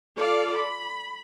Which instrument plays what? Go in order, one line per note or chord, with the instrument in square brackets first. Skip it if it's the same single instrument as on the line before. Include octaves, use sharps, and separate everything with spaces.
[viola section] F4 A4 D5 F5
B5